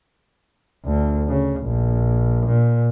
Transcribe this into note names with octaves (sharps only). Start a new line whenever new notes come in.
D2
C#3
A#1
A#2